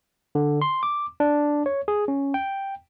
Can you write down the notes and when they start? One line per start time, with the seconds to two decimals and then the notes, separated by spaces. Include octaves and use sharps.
0.35 D3
0.62 C6
0.83 D6
1.20 D4
1.66 C#5
1.88 G#4
2.08 C#4
2.34 G5